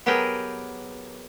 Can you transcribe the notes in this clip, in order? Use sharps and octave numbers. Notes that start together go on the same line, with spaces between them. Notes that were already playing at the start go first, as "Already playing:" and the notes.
F#3 B3 G4 G#4 A#4 G5